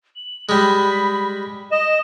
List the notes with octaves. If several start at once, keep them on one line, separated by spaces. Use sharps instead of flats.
F#7
G3 G#3 B5
D#5 E7